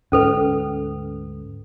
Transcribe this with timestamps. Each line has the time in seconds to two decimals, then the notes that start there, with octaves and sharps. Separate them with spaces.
0.12 D2 G#2 C#4 A4 B4